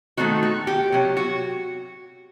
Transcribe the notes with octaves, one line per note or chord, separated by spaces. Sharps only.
D#3 A3 C4 D#4 F#4
F#4
G4
C3 F#3
F#4